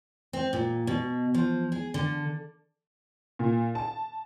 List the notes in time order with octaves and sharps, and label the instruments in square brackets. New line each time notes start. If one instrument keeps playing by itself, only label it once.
[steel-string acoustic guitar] C4
A#2
B2
F3
G#4
D3
[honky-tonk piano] A#2
A5